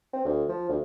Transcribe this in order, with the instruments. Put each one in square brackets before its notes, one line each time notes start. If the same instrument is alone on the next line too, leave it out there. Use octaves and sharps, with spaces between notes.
[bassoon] C4
D2
F3
D2